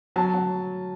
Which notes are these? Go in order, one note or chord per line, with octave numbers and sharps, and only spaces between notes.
F#3 A5
F#3